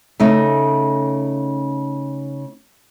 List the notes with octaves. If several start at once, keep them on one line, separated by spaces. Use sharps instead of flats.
C#3 A3 D#4